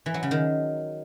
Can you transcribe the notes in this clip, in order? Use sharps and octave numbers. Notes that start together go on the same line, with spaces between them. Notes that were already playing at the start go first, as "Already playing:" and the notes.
E3
F#3
C#3
D#3